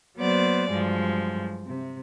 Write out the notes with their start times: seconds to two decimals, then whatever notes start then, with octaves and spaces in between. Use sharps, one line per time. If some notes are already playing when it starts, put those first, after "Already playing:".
0.16 F#3 A#3 B3 C5 D5
0.70 G2 F3 F#3 G#3
1.65 C3